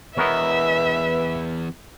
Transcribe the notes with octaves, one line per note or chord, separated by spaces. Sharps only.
E2 B3 A#4 B4 C#5 D#5 E5